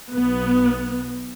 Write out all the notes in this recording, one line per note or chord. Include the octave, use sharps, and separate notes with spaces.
B1 B3